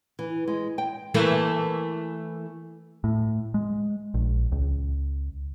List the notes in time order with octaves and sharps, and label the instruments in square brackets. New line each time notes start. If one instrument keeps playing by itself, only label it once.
[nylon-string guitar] E3
G#3
G5
[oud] E3 A3 A#3
[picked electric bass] A2
G#3
A#1
C#2